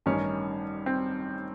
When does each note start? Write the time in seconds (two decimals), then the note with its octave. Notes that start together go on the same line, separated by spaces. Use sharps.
0.06 A1 G2 D#3 C#4
0.86 C4